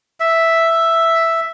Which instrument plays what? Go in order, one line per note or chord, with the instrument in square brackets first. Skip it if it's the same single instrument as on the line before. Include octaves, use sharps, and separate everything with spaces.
[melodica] E5